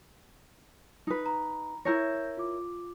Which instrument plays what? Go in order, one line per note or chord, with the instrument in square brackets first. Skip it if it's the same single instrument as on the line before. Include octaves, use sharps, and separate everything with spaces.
[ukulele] D#4 B4
[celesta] A#5 B5
[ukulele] E4 A#4 C#5 [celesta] G6 A#6
[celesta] F4 D6